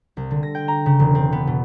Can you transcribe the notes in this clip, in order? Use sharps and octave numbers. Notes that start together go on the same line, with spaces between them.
C2
D3
A#6
G5
A#5
C#3
E1
C4
B3
B2